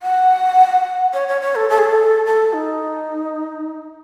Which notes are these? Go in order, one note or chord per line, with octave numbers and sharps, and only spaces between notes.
F#5
C#5
C#5
C#5
A4
A4
G#4
A4
A4
D#4